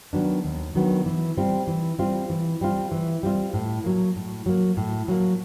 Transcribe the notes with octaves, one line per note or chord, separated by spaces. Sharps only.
D#3 F#3 B3 D4
D#2
D#3 F#3 B3 D4
E3
G3 C4 F4
E3
G3 C4 F4
E3
G3 C4 F4
E3
G3 C4 F4
A2
F#3 A#3
A2
F#3 A#3
A2
F#3 A#3